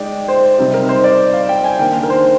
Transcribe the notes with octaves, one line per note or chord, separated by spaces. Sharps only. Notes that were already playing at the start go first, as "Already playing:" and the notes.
Already playing: G#3 D#4 D5 G5
C5
C3 G3 C4 D#4
A#4
C5
D5
F5
G5
G#5
D#3 A#3 D4 G5
A#4
C5